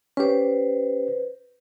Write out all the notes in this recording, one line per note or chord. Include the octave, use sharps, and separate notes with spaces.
C#4 G4 B4 C5